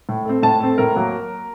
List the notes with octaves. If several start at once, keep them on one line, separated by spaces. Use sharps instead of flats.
A2
A3 C4
A2 A5
A3 C4
A2 A#4
F#3 A#3